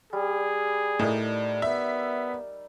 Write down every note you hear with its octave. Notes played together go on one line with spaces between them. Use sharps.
G3 G#4
A2 D#4 A#4 D5
B3 E5